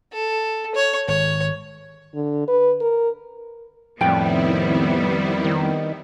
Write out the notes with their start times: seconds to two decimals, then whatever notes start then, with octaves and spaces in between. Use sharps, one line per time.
0.13 A4
0.75 C#5
1.08 G#1 C#5
2.15 D3
2.48 B4
2.81 A#4
4.01 F2 A2 D#3 G3 B3 C4 E4 G5
5.44 D#3